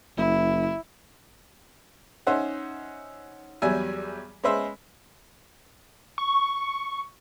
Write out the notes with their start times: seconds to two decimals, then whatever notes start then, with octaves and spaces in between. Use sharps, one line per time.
0.17 F#1 E4
2.27 C#4 D#4 C5 E5 F#5
3.62 E2 F#3 G3 G4 E5 G#5
4.43 G#3 C#4 B4 C5 E5
6.18 C#6